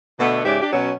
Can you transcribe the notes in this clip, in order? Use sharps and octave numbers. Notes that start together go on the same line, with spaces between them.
B2 D3 A3 B3 D#5
G#2 C#3 G4 D5 E5
D4 G4
B2 F#3 C#4